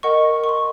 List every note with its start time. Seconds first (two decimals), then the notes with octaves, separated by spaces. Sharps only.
0.03 A#4 D#5 F#5 C#6
0.44 C#6
0.49 C6